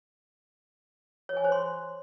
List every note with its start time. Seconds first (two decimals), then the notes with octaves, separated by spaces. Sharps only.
1.29 C#5
1.37 G#5
1.44 C5
1.52 C6